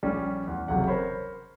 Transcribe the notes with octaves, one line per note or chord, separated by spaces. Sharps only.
A#1 G3 C#4
E2
F#1 C3 F#3 F#5
A#4 C5 C#5 B5